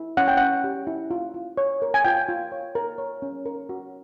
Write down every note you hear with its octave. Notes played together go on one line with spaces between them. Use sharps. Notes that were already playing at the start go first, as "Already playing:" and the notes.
Already playing: E4
C#4 F#5
G5
C#4 F#5
G4
E4
F4
F4
C#5
A#4
G#5
F4 G5
F4
C#5
A#4
C#5
C#4
A#4
F#4